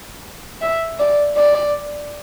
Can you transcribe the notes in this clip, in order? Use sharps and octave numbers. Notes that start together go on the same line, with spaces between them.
E5
D5
D5